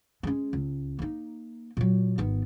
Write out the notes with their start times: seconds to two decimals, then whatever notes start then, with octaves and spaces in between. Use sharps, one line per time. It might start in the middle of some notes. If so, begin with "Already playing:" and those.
0.23 G#3 C#4
0.53 C#2
0.99 A#3 D#4
1.77 A#2 F#3
2.18 G#1 B3